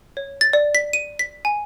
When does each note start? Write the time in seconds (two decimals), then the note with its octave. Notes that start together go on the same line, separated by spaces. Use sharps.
0.17 C#5
0.41 A6
0.53 D5
0.75 B6
0.93 D#7
1.19 B6
1.45 G#5